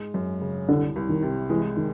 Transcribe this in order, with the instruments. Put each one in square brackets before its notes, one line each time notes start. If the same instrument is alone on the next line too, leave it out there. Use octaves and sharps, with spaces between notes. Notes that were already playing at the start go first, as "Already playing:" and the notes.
Already playing: [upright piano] G#2 G#3
F#2
C#3
[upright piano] C2 [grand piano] D3
[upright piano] C2
[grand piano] D#3
[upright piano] C3
[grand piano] E3 [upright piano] G#3
[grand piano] D#3